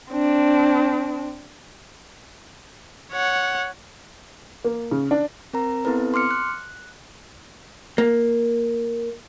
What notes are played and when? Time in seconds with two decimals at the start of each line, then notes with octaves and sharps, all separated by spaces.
0.11 C4 D4
3.12 C#5 F#5
4.64 A#3
4.91 C#3
5.11 D4
5.53 C4 A#4 A#5
5.85 B3 C4 E4 A4 B4
6.14 C6 D6 F6 C#7
6.31 F#6
7.98 A#3